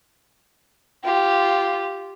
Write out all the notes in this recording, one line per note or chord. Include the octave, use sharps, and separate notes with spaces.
F4 G4